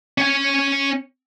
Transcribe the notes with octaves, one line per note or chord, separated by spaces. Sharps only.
C#4 G#5